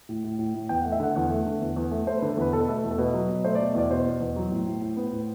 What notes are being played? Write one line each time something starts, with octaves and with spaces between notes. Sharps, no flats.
A2
A2
A2
A2
E2 G5
A3 F#5
E5
D3 F#5
E2 F#5
A3
D3
E2
E2
A3
A3 C5
D3 B4
A4
E2 B4
B2 A4
B4
A3 A4
E2
A4
B2 B4
F#3
B2
A3 C5
B2 D5
E2 D5
B2 C5
B2
E2
F#3
A2
A2
A2
B3
A2